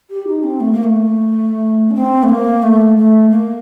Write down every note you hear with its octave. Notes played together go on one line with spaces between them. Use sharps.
G4
D#4
C4
A3
A#3
A3
D4
C4
A3
A#3
A3
A3
A#3